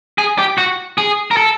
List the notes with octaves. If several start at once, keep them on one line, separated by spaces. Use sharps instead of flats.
G#4
G4
F#4
G#4
A#4
A4